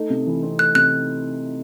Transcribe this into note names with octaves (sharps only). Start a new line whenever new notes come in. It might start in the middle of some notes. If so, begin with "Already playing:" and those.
Already playing: A3 D#4
C3
E3
C4
A3 F#6
C3 F#6